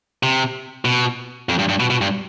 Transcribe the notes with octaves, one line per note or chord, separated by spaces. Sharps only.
C3
B2
F2
G2
G2
B2
B2
G2